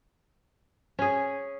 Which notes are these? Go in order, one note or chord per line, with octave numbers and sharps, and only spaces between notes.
C#4 G#4